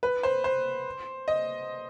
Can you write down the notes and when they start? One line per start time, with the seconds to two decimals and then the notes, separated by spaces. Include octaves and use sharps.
0.03 B4
0.23 C5
0.44 C5
1.28 D#5